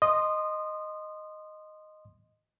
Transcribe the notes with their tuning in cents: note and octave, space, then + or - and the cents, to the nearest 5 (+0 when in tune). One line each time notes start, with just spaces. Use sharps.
D#5 -5 C6 +0 D#6 -25